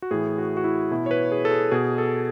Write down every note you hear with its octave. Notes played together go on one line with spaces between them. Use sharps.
F#4
A2 E3 G#4
F#4
F#4
E4
B2 E4
C#5
B4
G#4
A4
G#4
B2 G#4
A4